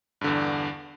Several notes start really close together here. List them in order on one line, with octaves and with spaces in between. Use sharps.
G2 D3 E2